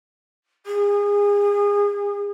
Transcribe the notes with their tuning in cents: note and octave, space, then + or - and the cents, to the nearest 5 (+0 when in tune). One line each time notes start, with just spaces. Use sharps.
G#4 -30